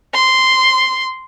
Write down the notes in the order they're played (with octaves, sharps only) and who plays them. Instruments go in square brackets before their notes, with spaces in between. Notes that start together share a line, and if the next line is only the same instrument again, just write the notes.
[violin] C6